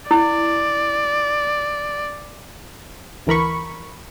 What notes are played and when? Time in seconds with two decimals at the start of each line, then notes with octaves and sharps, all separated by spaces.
0.11 E4 D5
3.27 D2 E3 A#4 B5 C#6